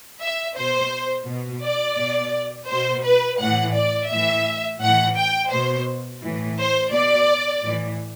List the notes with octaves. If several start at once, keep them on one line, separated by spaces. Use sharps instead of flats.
E5
B2 C5
B2
D5
B2
B2 C5
B4
A2 E3 F#5
D5
A2 E3 E5
A2 E3 F#5
G5
B2 C5
A2 E3
C5
B2 D5
A2 E3